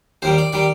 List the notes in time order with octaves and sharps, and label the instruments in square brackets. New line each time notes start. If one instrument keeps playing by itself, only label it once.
[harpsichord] D#2 D#3 G3 C5
D5
D#3 G3 D5